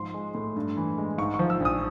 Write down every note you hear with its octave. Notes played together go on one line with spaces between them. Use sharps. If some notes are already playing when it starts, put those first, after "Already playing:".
Already playing: G#2 F3 C6
G#3
A2
G2
E3
G#3
G#2 C#6
C#6
F3
E6
A#1
D#6